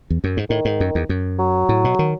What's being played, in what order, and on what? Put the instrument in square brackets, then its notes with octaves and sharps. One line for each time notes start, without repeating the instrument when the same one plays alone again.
[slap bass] E2
F#2
G#2
[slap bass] A2 [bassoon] D#3
[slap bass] G#2
F#2
E2
F#2
[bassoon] F#3
[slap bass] A2
B2
D#3